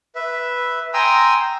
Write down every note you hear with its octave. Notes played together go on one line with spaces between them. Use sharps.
B4 E5
G5 G#5 A#5 C6 D#6 E6